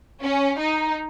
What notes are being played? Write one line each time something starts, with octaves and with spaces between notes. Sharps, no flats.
C#4
D#4